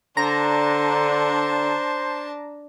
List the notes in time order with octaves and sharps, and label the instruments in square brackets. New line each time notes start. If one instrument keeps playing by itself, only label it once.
[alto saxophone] D3 [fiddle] D4 A5 [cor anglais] C5 [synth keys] A#5